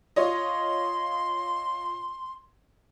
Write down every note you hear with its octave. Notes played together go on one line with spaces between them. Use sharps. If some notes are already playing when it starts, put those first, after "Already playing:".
F4 C#5 D#5 C6